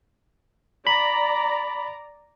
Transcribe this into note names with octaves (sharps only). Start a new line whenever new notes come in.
D5 A#5 B5